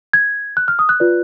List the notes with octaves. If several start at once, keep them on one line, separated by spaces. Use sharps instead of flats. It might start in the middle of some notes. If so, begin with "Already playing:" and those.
G#6
F#6
F6
D#6
F#6
F4 B4 D5